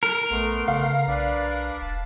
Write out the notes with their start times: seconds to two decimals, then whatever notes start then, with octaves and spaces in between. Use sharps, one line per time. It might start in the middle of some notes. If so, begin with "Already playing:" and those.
0.03 A#4
0.31 A#1 A3 B3 C6
0.68 C#3 F5
1.08 B1 D4 B4 D5
1.81 E1 A5